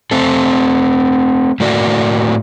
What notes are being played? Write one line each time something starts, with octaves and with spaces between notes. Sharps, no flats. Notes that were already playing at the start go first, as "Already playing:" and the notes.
A3 C4 A4
A2 A3 A#3 F#4 D5